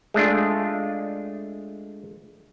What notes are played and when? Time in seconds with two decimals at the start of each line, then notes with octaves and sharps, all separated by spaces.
0.14 G#3 A3 D4 F4